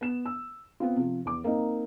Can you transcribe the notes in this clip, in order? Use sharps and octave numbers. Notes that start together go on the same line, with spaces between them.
B3 E7
E6
B3 C4 F4
C3 F3
E2 D6
A#3 C4 D#4